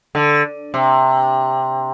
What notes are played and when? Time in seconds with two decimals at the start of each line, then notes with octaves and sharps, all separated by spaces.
0.15 D3
0.74 C3